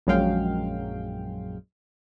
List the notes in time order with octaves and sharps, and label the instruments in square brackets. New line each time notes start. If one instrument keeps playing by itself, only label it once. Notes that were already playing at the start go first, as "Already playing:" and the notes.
[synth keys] A#1 F#2 F#3 G#3 F5 G5